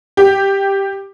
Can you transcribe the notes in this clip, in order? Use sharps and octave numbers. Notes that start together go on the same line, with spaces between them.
G4